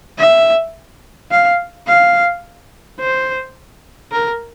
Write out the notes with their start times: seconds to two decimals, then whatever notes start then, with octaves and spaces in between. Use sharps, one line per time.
0.18 E5
1.31 F5
1.87 F5
2.99 C5
4.12 A#4